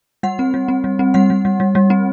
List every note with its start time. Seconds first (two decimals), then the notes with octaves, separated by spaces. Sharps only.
0.23 G3 F#5
0.39 C4
0.54 G3
0.68 C4
0.84 G3
0.99 C4
1.14 G3 F#5
1.30 G3
1.45 G3
1.60 G3
1.75 G3
1.90 C4